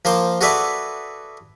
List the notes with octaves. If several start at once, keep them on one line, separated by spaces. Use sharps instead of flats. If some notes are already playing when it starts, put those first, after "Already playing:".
F3 A#3 C5 C6
F#4 G#4 A4 B4 D5 E5